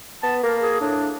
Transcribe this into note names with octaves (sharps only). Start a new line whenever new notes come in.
B3 A5
A#3 A#4
G#4
A2 D4